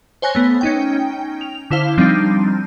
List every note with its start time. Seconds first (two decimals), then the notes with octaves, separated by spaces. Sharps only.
0.22 C5 C#5 G#5 F#6 A#6
0.35 A3 B3
0.61 C#4 D#4 G5
1.41 F7
1.71 D3 E4 C5 F5 G7
1.97 F3 G3 C4 D4 D#4